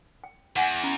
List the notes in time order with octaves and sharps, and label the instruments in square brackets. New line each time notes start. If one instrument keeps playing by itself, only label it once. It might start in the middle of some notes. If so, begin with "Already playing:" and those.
[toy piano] G5
[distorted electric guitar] E2 [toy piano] F#5 G#5
[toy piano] C#4 A#5 B5